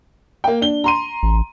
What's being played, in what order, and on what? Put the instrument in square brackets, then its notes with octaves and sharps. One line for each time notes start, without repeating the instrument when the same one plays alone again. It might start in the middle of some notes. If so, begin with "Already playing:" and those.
[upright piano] A#3 G5
D4 G7
A#5 C6 D#7
[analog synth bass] A1